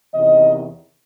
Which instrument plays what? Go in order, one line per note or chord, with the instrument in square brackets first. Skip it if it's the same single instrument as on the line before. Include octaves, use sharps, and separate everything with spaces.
[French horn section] E2 C3 D#3 D#5